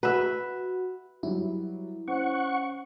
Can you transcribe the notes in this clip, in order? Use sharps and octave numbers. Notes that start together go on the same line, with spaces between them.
F#4 B4 E5
F#3 G3 E4
C#4 C5 F#5 C#6